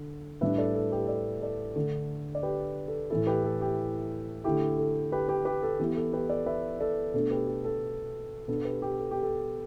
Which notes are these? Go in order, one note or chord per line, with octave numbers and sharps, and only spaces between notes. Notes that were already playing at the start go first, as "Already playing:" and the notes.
Already playing: D3
A2 G3 D4 B4 E5
A4 D5
A4
G4 B4
A4 D5
A4 D5
D3 A3 D4
D5
G4 B4
A4
A2 E3 A3 E4 A4
G4 B4
A4
G4
D3 A3 E4 G4
A4
G4 B4
G4 B4
G4 B4
A4
E3 B3 E4 G4
A4
G4 B4
A4 D5
B4 E5
A4 D5
B2 A3 D4 A4
G4 B4
G4
A4
B2 B3 D4 A4
G4 B4
G4
A4
G4
A4